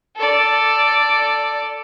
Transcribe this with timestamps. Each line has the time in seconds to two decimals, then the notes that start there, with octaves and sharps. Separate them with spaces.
0.16 A4 D5